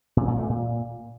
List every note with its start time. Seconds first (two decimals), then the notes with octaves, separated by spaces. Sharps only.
0.17 A#2
0.28 A#2
0.39 A3
0.49 A#2